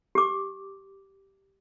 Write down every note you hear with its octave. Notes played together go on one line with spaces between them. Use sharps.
G4 D6